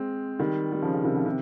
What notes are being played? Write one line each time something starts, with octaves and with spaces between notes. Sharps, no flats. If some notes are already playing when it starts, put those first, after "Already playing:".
Already playing: G#3 C4
D#3 G3
G3
C#3 F3
C#3
C3 D#3
C#3 F3
C3 D#3